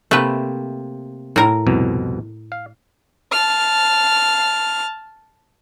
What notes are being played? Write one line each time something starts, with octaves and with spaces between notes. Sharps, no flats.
C3 A3 A#3 C4 B4
A2 A#4
C2 F2 B2
F5
A5 F6